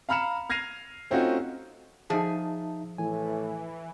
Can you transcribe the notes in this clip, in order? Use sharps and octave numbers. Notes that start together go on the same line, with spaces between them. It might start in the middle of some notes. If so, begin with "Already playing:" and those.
F5 A#5 B5 F6 C#7 E7
F6 G#6 A#6 C7 D#7 F7
A3 C4 C#4 D#4 F4 F#4
F3 D#4 G#4 E5 A5
A2 E3 G#5